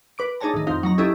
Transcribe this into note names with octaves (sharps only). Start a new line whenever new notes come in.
B4 D6 D7
D4 D#4 G#4 C#5 A5 A#5
A2 D#3
F2 C4 D#4 F5
F#3 D#4 A#5
C#4 E4 G4 A4 D#5